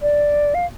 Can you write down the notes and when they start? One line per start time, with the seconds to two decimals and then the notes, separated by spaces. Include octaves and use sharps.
0.02 D5
0.54 F5